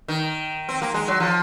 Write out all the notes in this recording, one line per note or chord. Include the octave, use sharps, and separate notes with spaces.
D#3
C4
A#3
G#3
F#3
F3